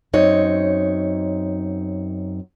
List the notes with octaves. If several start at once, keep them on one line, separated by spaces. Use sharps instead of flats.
F#2 C4 D#4 C#5